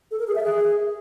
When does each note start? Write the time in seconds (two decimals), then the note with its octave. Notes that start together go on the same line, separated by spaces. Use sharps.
0.11 A4
0.19 A#4
0.27 G#4
0.35 E5
0.43 G#4